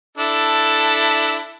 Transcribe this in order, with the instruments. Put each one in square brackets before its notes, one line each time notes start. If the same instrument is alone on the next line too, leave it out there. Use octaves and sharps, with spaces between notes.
[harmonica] D4 E4 A4